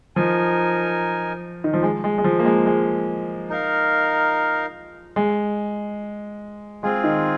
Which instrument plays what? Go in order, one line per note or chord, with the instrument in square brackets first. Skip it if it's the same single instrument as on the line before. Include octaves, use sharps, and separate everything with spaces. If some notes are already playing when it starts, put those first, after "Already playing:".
[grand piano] F3 [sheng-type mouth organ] D#4 A#4 G#5
[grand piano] D#3
F3
G#3
G#3
G#3
F3
A#3
G#3
G#3
[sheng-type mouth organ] D#4 A#4 F5
[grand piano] G#3
[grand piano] G#3 [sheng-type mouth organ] C4 F4 G#4
[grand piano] D#3